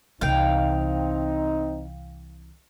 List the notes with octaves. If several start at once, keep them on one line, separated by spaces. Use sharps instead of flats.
C2 E3 C4 D#4 F5 G5